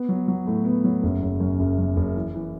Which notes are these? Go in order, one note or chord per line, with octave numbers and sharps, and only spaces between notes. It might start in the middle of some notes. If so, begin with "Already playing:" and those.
Already playing: B3
F#3
F#3
A2
B3
F#3
F#1
F#1
F#2
F#1
F#2
F#1
E3
E3